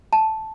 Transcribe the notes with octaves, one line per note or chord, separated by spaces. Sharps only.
A5